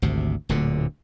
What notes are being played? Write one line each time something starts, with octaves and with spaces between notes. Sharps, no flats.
G#1 D2 C3
D1 D2 A#2 D3